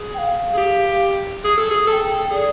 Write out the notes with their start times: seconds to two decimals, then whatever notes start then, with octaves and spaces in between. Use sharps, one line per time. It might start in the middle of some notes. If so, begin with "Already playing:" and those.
Already playing: G#4
0.14 G5
0.18 F5
0.53 G#4
0.57 G4
1.44 G#4
1.57 A4
1.71 G#4
1.87 A4 A5
1.92 G5
2.10 A4
2.30 G#4 D5